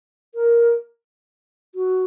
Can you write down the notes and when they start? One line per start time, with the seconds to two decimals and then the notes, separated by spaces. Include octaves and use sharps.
0.35 A#4
1.75 F#4